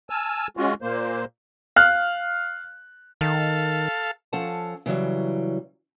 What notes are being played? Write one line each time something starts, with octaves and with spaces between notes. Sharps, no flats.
G#5 A5 E6 F6
G#3 C#4 F4 F#4
A#2 A#3 C5
F5 F6 F#6
D#3 A4 F5
F3 C#4 A4 F5 F#5 A5
C#3 E3 F#3 G3